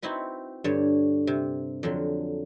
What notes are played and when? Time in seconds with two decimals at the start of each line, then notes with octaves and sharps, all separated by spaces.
0.02 C4 D#4 E4 F#4 B4
0.64 G2 D3 C#5
1.27 C3
1.83 F2 D3 F#3